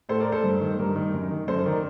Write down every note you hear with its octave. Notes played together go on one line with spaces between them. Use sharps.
A2 A4 C5
A#4 D5
A4 C5
G2
D#3
G2 G4 A#4
D#3
F#2
D#3
F#2 A4 C5
D#3 A#4 D5